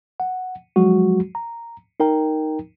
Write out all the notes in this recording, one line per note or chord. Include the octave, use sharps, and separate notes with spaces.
F#5
F3 F#3 G#3 F#4
A#5
D#4 A#4 G5 A#5